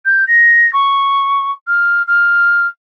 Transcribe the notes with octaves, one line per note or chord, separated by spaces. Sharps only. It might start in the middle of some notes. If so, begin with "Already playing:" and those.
G6
A#6
C#6
F6
F6